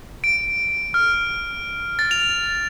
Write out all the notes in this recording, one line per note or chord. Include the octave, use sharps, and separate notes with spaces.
D7
F6
A6
F7